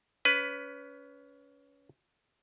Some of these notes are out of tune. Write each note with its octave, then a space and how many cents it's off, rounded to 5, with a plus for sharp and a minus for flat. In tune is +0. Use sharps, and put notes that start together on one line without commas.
C#4 +30 B4 +10